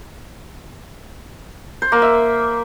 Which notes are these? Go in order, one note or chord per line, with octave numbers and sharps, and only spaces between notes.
C5
A#3
E5